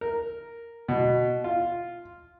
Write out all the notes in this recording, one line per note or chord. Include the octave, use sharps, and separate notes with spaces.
A#4
B2
F4